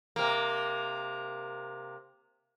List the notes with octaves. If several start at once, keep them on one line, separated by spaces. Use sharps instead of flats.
C3 A#3